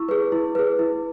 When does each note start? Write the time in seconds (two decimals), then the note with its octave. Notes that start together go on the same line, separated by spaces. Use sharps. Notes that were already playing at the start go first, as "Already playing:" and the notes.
Already playing: E4 C#6 E6
0.09 G#4 B4
0.32 E4
0.55 G#4 B4
0.79 E4